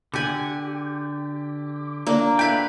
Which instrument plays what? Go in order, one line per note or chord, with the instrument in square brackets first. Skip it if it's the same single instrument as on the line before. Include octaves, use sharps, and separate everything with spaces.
[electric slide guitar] D3 G4 [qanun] F#5 G#5
[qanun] A#3 D4
[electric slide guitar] A4 E5 G5 [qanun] B4 F5